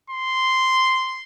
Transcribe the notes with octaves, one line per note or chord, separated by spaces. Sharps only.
C6